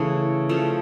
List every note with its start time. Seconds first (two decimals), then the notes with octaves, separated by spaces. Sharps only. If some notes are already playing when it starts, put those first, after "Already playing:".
Already playing: C#3 E3 A3 C#5
0.49 C#3 F3 A3